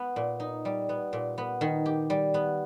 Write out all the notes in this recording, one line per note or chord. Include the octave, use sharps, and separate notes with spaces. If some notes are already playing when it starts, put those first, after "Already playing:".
Already playing: B3
A#2
D#4
G3
B3
A#2
B3
D#3
G4
G3
B3